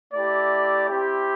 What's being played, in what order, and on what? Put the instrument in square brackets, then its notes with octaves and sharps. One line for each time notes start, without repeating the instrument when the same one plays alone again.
[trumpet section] A3 E4 G4 D5
C4 E4 G4